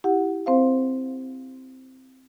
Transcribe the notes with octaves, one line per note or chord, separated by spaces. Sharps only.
E4 G4 F#5
C4 C5 F5